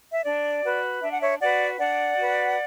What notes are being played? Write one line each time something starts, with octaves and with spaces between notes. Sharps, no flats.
E5
D4 D5
F#4 B4
D4 E5
F#5
C#5 E5
F#4 B4 D5 F#5
D4 D5 F#5
F#4 B4